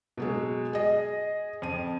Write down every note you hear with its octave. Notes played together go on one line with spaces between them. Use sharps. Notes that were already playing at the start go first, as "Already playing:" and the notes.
B2 F#3 G#3
G#4 D#5
F2 D#7